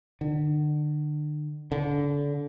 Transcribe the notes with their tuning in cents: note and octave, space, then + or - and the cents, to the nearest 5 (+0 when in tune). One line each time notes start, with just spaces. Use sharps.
D3 +35
D3 -30